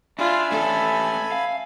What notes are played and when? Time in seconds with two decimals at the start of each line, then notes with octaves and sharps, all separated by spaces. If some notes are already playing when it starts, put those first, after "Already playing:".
0.19 D4 F4 E5 G#5 B5
0.52 A3 C#4 A4
1.32 F5